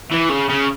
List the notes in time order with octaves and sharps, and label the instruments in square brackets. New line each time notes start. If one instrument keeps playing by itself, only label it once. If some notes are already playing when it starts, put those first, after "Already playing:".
[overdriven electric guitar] E3
C#3
C#3